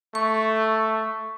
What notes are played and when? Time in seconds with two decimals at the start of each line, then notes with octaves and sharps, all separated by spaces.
0.15 A3 C#6